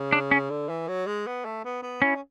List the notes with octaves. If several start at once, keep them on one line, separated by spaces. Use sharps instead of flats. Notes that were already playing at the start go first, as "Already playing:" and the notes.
Already playing: C#3
D4
C#4
D3
E3
F#3
G#3
B3
A3
B3
B3
C#4 E4
C#4